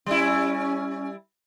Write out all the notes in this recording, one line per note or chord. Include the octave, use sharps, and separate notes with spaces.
G3 C#4 E4